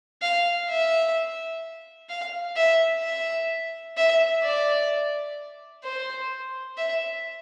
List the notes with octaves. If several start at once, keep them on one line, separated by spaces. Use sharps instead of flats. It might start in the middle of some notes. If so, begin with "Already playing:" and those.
F5
E5
F5
E5
E5
E5
D5
C5
E5